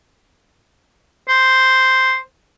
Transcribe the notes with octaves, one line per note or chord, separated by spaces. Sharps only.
C5